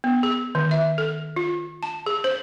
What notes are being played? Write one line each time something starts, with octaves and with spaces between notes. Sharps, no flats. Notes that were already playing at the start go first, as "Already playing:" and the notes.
B3
G#4
D#3
E5
A4
F4
A5
G#4
C5